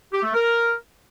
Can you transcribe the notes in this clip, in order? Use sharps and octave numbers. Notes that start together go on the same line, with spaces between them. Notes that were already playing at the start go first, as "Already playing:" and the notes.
G4
A3
A#4